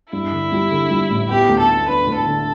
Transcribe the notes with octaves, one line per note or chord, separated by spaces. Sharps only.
G2 E4
D3
G3
D3
G3
A1
B3 G4
D2
A4
B3
D4 B4
D2
A4
D3